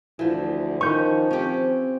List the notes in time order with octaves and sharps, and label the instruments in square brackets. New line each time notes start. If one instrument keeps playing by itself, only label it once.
[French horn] D2 [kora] E3 F3
[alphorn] D#3 [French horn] F3 [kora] C#4 [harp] C#6 G6
[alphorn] C4 [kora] C#4 G4